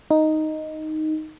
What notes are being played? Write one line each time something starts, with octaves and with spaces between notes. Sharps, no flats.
D#4